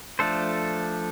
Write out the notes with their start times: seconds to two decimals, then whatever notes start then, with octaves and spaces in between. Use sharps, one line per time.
0.19 F3 A3 D4 A4 C5